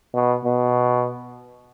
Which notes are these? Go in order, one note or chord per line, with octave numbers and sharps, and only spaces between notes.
B2
B2